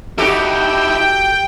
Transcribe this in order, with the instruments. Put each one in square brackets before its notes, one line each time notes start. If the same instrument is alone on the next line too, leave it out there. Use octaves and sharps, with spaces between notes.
[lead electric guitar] D#4 E4 [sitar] F#4 G4 A4 [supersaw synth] G5